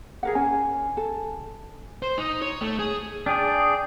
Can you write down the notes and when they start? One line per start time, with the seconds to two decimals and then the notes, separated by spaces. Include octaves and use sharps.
0.23 G#4 A#4 F#5
0.35 C#4 G#5
0.97 A4
2.03 C5
2.18 D#4
2.42 C#5
2.61 A3
2.79 G#4
3.26 D4 G#4 G5